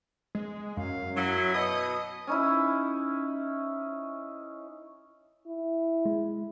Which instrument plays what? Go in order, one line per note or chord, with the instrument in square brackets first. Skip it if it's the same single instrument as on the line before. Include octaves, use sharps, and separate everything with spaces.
[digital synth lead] G#3
[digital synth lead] F#2 [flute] F5
[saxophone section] F#3 [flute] E4
[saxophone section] B2 D#5 [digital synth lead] D#6
[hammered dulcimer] C#4 D#4 E4
[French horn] E4
[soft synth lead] G#3